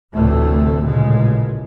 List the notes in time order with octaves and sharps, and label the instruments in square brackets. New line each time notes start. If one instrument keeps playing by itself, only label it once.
[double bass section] F1 D2 A2 C3 E3 A3
A1 A#2 C#3 G#3